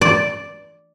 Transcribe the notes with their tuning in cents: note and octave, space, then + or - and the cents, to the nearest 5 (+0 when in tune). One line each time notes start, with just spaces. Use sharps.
D5 -5